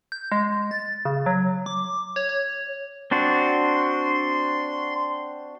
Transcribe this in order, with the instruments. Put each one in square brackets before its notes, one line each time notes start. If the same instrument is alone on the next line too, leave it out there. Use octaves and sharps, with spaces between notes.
[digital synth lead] G6
G#3
A6
C#3
F#3
D6
C#5
C#5
[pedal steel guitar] C4 D4 F#4 [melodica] C6